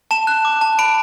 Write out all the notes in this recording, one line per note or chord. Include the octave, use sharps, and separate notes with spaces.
A5 E7
F#6
D6
A5
B5 D7